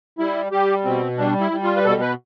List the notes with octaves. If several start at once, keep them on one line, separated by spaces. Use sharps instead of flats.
G3 E4
G3 G4
B2 C4
G3 D4
E4
G3
F4
B4
B2 A4
B4